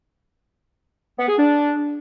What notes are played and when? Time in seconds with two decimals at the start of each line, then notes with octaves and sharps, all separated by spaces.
1.19 B3
1.28 G#4
1.38 D4